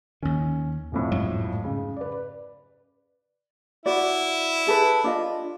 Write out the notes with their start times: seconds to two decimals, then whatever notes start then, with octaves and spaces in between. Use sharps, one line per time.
0.22 D#2 D#3 C#4
0.92 B1 F2 A2
1.11 G#2 F#3
1.64 C#3
1.97 B4 D5
3.86 E4 F#4 D5
4.67 G#4 A4 B4
5.04 D4 F4 D#5